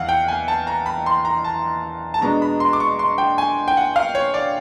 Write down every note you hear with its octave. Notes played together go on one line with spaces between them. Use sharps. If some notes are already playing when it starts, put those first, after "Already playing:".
Already playing: E2 E3 F5 F#5
G5
G#5
A5
A#5
B5
C6
A#5
A5
A5
B2 G#3 B3 D4 A#5
B5
C6
D6
C#6
C6
G5
G#5
G5
F#5
F5
C#5
D5